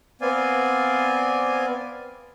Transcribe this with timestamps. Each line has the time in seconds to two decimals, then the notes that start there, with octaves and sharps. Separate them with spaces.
0.21 B3 C4 D5 F5 G#5